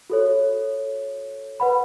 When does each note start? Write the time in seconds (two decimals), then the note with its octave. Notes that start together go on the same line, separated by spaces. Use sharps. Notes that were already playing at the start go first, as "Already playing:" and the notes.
0.10 F#4 A4 C#5
1.60 B4 F#5 B5